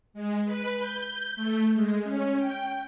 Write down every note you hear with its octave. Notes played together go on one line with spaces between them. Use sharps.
G#3
B4
G6
A3
G#3
C#4
G5